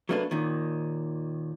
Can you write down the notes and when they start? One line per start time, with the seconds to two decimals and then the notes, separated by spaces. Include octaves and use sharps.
0.09 F#3 A3 A#3 D4 B4
0.31 D#2 A#2 D#3